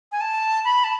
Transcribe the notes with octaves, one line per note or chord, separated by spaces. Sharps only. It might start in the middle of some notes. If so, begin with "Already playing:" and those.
G#5
A5
B5
A5